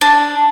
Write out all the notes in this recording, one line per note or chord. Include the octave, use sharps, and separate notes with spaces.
D4